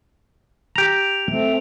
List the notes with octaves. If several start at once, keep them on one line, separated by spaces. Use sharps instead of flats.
G4 A#5 D7 F7
A3 C4